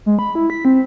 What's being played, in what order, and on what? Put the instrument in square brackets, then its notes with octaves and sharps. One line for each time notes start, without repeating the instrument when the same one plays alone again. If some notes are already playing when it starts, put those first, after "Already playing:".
[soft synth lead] G#3
B5
E4
B6
C4